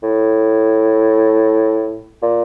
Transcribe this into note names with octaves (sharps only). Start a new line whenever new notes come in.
A2
A#2